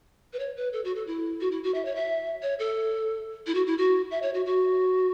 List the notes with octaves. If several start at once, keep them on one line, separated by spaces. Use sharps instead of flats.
B4
C#5
B4
A4
F#4
A4
E4
F#4
E4
F#4
E5
C#5
E5
C#5
A4
E4
F#4
E4
F#4
E5
C#5
F#4
F#4